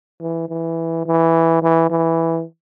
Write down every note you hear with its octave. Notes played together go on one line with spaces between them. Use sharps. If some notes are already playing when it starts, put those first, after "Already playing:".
E3
E3
E3
E3
E3